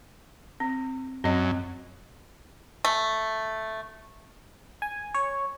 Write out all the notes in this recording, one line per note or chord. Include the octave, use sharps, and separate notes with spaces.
C4
F#2 C4 D#5
A3
G#5
C#5